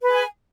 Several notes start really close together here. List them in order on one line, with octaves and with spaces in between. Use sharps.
B4 G#4 G#5